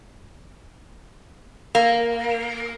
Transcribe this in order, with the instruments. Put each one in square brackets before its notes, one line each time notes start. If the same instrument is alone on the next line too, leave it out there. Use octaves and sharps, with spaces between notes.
[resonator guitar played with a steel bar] A#3